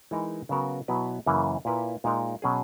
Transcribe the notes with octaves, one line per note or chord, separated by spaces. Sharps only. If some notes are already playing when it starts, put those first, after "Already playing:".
E3 G#3 D#4 A#4
C#3 F#3 B3 F#4 A#4
B2 F#3 B3 E4 B4
F#2 C#3 E3 A#3
A#2 A#3 E4 B4
A#2 G#3 D#4 A#4
B2 F#3 C#4 G#4